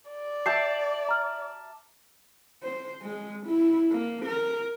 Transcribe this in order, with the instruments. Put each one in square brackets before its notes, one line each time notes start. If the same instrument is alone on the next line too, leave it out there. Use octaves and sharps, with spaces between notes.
[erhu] D5
[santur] E5 A5 D6 [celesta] G6 C7
[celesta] A#5 F6
[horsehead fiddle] C5
G#3
E4
A#3
A#4